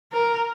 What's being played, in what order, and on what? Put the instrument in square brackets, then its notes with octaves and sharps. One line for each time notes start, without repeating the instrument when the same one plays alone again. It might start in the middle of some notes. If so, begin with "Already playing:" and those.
[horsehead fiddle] A#4